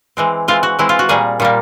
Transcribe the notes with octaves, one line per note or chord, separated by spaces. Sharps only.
E3 G#3 C4
E3 G#3 C4 F4
F#4
E3 G#3 C4 E4
F4
F#4
A#2 G3 A#3 G#4
A#2 G3 A#3